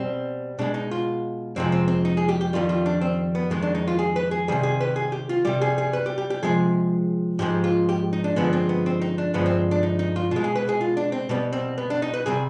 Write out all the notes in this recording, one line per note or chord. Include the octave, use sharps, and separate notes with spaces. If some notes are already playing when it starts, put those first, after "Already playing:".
Already playing: B2 G3 C4
B2 G#3 D4
D#4
F4
F2 C3 F3 G#3 C4
C4
C4
D#4
G#4
G4
G4
F2 D#3 G3 F4
F4
D4
C4
B3
F2 D#3 G#3
D4
D#4
F4
G#4
B4
G#4
C3 D#3 G3 G#4
G#4
B4
G#4
G4
F4
C3 G3 G4
G#4
G#4
B4
G4
G4
G4
C3 F3 G#3 G#4
G#2 F3 G#3 G4
F4
G4
D#4
D4
G2 D3 F3 G#3 B3
C4
B3
C4
D#4
D4
G2 D3 F3 G#3 B3
C4
D4
D#4
D#4
F4
B2 G#3 F4
G#4
B4
G#4
F4
D4
C4
B2 G3 B3
C4
B3
D4
D#4
B4
C3 G3 G#4